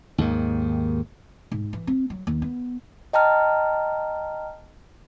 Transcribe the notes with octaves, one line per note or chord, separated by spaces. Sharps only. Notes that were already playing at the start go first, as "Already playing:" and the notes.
D#2 G#2 D#3
G#2
E3
C4
F#3
D#2
B3
D#5 G5 A5 A#5 F6